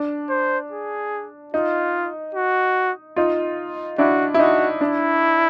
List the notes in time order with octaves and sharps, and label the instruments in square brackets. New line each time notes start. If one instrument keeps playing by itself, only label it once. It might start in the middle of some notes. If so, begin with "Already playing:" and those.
Already playing: [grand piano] D4
[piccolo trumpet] C5
G#4
[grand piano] D#4 [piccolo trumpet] F4
[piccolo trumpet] F#4
[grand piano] D#4 F4
[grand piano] D4 E4 [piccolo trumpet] F#4
[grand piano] E4
[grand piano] D#4 [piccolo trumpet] F#4
[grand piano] D4 [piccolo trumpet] E4